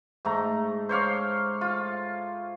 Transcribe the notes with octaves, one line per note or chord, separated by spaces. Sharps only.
G#2 A3 A#5
C5 C#5 F5 D6
F4